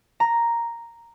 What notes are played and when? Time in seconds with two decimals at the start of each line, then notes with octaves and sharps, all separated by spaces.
0.20 A#5